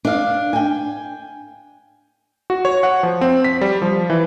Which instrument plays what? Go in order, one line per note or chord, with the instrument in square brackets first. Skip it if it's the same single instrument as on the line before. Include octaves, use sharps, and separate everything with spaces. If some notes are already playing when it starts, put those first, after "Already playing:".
[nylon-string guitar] D4 F5
G5 G#5
[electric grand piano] F#4
C#5
F#5
F3
C4
B6
G3
F3
E3